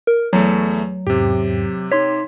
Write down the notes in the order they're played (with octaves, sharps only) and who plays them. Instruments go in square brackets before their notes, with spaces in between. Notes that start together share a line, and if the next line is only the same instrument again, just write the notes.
[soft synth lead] A#4
[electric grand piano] E2 A3 [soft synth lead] F#3
[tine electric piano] E2 G#2 [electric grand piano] C3 G4
[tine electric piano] D#4 C6 B6 [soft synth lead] C#5